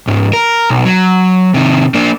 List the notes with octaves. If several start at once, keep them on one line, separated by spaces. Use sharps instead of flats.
C#2 G#2
A#4
B1
F#3
C3 D#3
A#3 D4